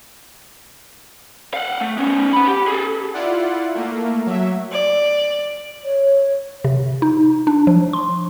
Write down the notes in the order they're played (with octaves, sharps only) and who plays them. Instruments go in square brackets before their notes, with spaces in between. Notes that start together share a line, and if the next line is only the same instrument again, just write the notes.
[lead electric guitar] F5 F#5
A3
B3 C#4
F#5 B5
G4
G#4 A4
[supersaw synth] E4 F4 D5 F#5
A3 A#3
F#3 E5
[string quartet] D5
[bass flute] C#5
[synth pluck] C3
D#4
D4
F3
C6